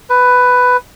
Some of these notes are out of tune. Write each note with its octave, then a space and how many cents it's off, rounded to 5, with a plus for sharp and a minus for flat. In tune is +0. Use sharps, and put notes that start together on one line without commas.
B4 +10